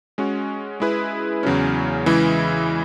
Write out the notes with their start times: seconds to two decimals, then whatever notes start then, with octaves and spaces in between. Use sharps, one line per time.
0.18 G#3 C#4 F#4
0.80 G#3 E4 G#4 B4
1.43 E2 C#3 F#3 C#4
2.06 C#3 E3 G#3 E4